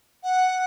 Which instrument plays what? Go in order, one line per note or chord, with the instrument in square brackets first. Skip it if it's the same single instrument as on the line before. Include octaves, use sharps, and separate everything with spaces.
[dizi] F#5